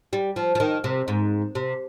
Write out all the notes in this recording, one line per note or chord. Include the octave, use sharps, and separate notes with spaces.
G3
F3
F3
D#3
C3
G#2
C3